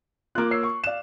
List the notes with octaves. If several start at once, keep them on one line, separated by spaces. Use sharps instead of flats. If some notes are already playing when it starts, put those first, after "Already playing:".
A#3 F4 D6 F#6
C#5 E6 C7
C#6
D5 F5 F#6 E7